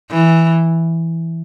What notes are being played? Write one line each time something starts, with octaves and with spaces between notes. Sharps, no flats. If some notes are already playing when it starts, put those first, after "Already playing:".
E3